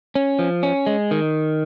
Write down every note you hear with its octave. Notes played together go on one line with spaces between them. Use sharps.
C#4
F3
C#4
G#3
D#3